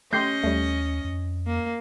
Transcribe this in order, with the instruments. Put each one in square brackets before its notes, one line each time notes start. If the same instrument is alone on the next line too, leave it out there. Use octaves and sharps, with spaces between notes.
[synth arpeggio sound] A3 G4 C6 [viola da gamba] C#4 D#5 [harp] G6 C7
[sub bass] D#2 [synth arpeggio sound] G3 A3
[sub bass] F2
[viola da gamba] A#3